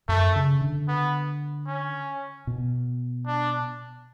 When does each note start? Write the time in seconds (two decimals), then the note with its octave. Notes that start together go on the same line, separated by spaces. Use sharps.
0.08 F#2 A3
0.36 C#3
0.61 D3
0.88 B3
1.67 C#4
2.47 B2
3.26 D4